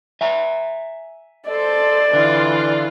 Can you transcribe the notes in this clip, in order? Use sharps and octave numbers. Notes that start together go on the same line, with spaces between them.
E5 G#5 A#5
A4 C5 D5
D3 E3 F4